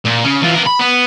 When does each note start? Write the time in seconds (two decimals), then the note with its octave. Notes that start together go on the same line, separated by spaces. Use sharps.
0.05 A#2
0.24 C#3 C#4
0.41 E3 F4
0.54 B3 A#4
0.66 B5
0.79 B3